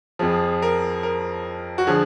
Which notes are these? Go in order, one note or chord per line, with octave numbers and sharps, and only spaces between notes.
F2 F3 G#4
A#4
A#4
F#4
D3 F3 G#4